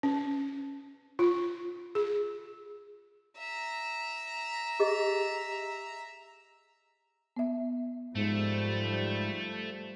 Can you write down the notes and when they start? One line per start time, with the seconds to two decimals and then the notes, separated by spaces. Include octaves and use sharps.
0.03 C#4
1.19 F4
1.95 G#4
3.38 E5 A#5
4.80 G4 G#4 D#5
7.36 B3 E5
8.15 G#2 F3 G3 A3